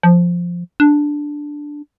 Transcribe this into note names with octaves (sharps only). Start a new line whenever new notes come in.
F3
D4